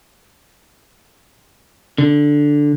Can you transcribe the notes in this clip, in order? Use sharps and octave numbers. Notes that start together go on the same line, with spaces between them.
D3